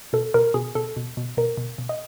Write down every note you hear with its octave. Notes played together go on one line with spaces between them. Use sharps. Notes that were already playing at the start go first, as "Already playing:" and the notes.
B2 A4
B2 A#4
B2 G#4
B2 A4
B2
B2
B2 A#4
B2
B2
D#5